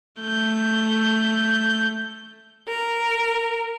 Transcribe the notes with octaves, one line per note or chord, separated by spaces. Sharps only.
A3 G6
A#4